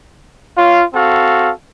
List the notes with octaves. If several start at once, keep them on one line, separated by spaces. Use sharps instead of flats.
F4 C#5 F5
C4 F#4 A4 F5